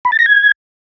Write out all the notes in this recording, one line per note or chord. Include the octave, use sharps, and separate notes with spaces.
B5
A6
A#6
G#6